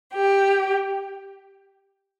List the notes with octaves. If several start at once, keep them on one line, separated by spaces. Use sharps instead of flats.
G4